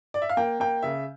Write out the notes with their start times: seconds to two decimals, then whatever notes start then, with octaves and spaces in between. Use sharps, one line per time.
0.14 D5
0.22 E5
0.29 F5
0.37 A#3 G5
0.60 A#3 G5
0.82 C#3 E5